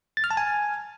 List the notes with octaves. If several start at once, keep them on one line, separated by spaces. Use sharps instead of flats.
A6
F6
A5
G#5